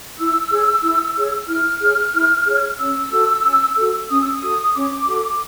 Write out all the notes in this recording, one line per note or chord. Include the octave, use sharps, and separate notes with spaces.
E4 E6
G#4 C#5
E4
G#4 C#5
E4 F6
G#4 C#5
E4
G#4 C#5
C#4 E6
F#4 A4
C#4
F#4 A4
C#4 D#6
E6
D#6
F#4 A4
C#4 D6
F#4 A4